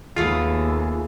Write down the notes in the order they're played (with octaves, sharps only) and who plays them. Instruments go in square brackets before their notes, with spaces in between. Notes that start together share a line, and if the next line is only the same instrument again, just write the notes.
[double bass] D#2 [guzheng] G#3 A3 B3 [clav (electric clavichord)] F4 [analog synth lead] G#4